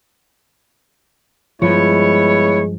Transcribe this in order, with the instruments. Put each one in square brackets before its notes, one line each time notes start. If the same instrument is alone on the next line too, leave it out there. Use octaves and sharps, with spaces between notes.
[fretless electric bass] G2 F3 [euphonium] G#3 [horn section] B3 E4 C#5